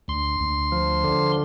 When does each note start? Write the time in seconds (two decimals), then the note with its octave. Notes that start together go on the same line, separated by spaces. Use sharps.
0.08 D2 C6
0.40 D2
0.72 F3
1.04 D3